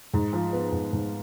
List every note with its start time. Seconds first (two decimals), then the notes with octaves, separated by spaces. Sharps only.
0.13 G#2
0.33 F3
0.53 B3
0.72 G#2
0.93 G#2